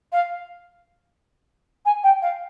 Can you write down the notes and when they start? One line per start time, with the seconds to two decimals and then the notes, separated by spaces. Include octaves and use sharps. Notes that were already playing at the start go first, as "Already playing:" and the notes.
0.12 F5
1.85 G#5
2.03 G5
2.22 F5